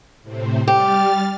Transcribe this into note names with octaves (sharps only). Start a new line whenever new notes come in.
A2 C3 C4
G3 G4 F6 A6